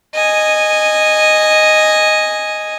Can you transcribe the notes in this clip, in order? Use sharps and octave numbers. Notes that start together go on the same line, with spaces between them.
D#5 G#5